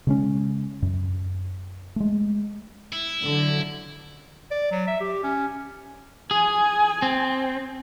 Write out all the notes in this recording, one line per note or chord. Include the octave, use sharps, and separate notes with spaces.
C#3 G#3 C#4
F#2
G#3 A3
E4
D3 F#3
D5
F#3
E5
G4
C#4
G#4 G#5
C4